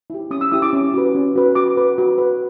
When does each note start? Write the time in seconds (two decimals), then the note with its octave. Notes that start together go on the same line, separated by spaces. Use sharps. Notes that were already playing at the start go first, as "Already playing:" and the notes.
0.10 E4 G4
0.31 C#4 D#6
0.41 E6
0.52 E4 G4 D#6
0.62 D6
0.73 C#4
0.94 F#4 B4
1.15 C#4
1.36 F#4 B4
1.55 F#4 D6
1.77 B4
1.98 F#4
2.18 B4